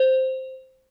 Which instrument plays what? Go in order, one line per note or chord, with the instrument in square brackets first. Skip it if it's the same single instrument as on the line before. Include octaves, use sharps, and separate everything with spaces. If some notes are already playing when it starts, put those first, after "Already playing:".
Already playing: [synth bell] C5